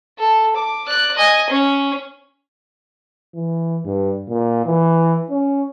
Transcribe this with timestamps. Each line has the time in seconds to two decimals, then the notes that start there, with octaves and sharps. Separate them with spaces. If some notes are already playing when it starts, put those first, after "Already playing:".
0.18 A4
0.56 D6
0.88 D5 F#6
1.17 D#5 G#5
1.50 C#4
3.35 E3
3.85 G2
4.29 A#2
4.66 E3
5.30 C#4